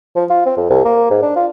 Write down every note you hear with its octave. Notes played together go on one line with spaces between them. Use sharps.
F3
F4
C4
F2
C2
A#3
G#2
D4
F4